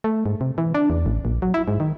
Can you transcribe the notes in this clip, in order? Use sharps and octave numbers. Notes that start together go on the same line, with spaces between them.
A3
G#2
C3
E3
D4
E2
A1
A#1
F#3
E4
G#2
D#3